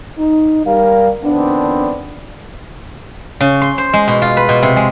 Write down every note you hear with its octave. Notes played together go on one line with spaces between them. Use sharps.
D#4
G3 A#4 F5
F2 D#3 B3 C4 D4
C#3
C6
C5
G#3
B2
F4
B4
B2
C3
G#3